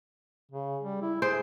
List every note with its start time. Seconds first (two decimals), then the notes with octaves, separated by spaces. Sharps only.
0.51 C#3
0.82 G3
1.02 E4
1.22 G#4 C5